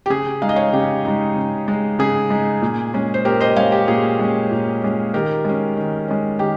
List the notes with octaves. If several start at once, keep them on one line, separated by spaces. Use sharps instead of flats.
G4
C#3 G#4
G#3 D#4 F5
D#5
C#5 F5
C#3 G4
G#3 D#4
C#3
G#3 D#4
C#3 G#4
G#3 D#4
A#2
G#3 C#4
C5
A#2 G4 A#4
C5 D#5
G#3 C#4 C#5 F5
G4
A#2 G#4
G#3 C#4
A#2
G#3 C#4
D#3 G4 A#4
G#3 C#4
D#3
G#3 C#4
D#3 G4